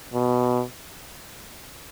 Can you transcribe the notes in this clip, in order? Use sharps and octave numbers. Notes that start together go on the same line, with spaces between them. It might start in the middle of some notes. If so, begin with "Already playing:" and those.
B2